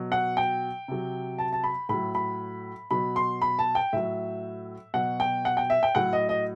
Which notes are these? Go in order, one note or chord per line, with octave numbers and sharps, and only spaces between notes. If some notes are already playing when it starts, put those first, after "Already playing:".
Already playing: B2 F#3
F#5
G5
C3 F#3
A5
A5
B5
A2 F#3 B5
B5
B2 F#3 B5
C6
B5
A5
G5
A2 F#3 E5
B2 F#3 F#5
G5
F#5
G5
E5
G5
A2 F#3 F#5
D#5
D#5